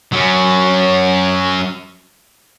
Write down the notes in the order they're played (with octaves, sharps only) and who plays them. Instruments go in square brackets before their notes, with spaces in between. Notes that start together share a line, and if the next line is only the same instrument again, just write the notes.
[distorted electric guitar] F#3 C#4